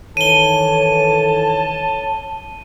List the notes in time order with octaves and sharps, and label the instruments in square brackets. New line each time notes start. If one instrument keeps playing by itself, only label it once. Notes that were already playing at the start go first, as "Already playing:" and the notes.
[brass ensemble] D#3 E3 A4 [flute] C#5 [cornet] A5 [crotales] D#7 G7